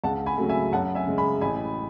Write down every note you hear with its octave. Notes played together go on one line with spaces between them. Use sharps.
C#2 F#5 A5
G#5 B5
C#3 F#3 A3
E5 G#5
F#2 F#5 A5
E5 G#5
C#3 G#3
G#5 B5
A1 G#5 B5